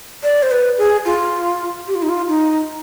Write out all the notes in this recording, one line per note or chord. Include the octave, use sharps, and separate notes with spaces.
D5
C5
B4
G#4
F4
G4
F4
D#4
F4
D#4